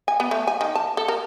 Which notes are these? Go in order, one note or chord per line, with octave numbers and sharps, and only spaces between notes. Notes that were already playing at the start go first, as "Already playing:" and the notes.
G#5
B3
A3
G#5
D#3
A5
A4
A#4